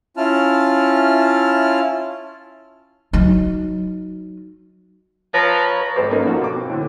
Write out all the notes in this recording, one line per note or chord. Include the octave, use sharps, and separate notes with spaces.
C#4 E4 F4 A5 F6
F#3 D#4
F3 B4 C#5 A#5
G#1 A4 B4 C5 D6
F#3 A#3 B3 C#4 D#4
F3 F#4 A4
B2 D6
C4
A2 D3